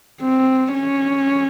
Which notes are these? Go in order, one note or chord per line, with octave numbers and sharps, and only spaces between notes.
C4
C#4